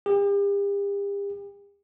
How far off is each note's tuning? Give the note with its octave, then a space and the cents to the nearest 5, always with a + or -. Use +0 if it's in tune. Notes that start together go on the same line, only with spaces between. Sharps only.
G4 +40